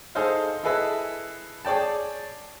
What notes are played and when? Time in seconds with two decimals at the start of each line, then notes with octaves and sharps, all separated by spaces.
0.15 D#4 G#4 A4 C5 D#5 F5
0.63 E4 G#4 A4 B4 D#5 E5
1.65 G#4 C#5 D5 G5 A5